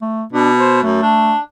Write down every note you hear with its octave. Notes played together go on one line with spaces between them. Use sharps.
A3
B2 D4
C5
F#2 A3
D4